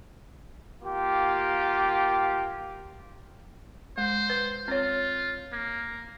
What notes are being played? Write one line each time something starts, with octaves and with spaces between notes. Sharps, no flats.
A#3 F4 G4
G#3 C5
B4
C4 F4 C#5
A#3